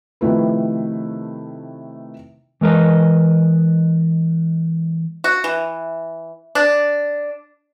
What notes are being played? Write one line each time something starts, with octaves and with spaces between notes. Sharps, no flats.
C3 D#3 F3 A3 E4 B4
E3 G#3 A#4 B4 D#5
F#4
E3
D4